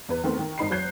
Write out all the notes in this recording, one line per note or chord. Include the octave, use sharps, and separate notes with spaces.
E2 B4
D#3 A3 B3 C4
D#3
G#1 D#4 B5 C7
F#1 F#3 F#6 G6 C7